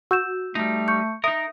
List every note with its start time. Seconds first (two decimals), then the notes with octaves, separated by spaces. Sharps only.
0.11 F#4 E6 G6 E7
0.55 G3 A3 D#4
0.88 C#6 G6 C#7
1.24 D#4 A#4 E5 D#6